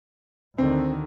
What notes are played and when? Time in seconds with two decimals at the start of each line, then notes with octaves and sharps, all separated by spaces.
0.58 D2 D3 D#3 C4